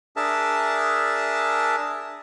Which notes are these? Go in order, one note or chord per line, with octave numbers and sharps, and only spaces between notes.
D4 G#4 A#4 E5 A5